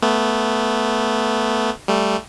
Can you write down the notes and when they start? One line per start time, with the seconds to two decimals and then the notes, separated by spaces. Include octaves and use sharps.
0.02 A3 B3
1.88 G3 A3